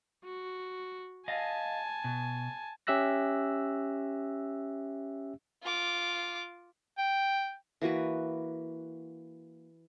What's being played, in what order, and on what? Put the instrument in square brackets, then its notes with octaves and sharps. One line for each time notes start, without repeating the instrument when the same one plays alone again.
[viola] F#4
[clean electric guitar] D#5 F5 [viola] G#5 A5
[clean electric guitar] B2
[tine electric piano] C#4 G4 E5 E6 F#6 A#6
[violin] F4 D6
[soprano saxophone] G5
[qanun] E3 A#3 F#4 B4